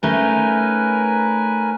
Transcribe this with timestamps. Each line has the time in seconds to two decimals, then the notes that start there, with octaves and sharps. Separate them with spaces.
0.03 A3 C#4 D#4 A#4 B4 G#5